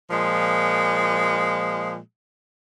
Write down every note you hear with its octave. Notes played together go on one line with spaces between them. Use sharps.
A#2 F3 G#3